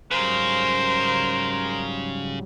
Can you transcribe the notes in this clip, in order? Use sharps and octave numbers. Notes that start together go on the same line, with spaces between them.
G#2 C#3 F#3 G3 A#4 C5